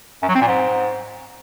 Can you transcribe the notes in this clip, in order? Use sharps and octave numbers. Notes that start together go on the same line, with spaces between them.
F#2
F#3
C4
A#2
G#2